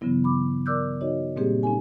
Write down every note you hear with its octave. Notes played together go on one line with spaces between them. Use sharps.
G2 C#3 E3 F#3 B3 E4
B5 D6
A#4 D5 D6 E6 F#6 G6
D#4 F#4 C#5 D#5
A#2 G3 A#3 C4 G4 G#4
C4 C#4 D#4 A4 G#5